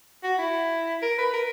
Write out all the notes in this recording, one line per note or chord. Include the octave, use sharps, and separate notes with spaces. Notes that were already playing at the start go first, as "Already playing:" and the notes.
F#4
E4
A#4
B4
A#4